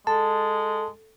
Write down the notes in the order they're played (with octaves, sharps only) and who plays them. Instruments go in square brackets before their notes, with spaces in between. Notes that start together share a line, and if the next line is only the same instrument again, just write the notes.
[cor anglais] G#3 [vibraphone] A4 [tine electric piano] A5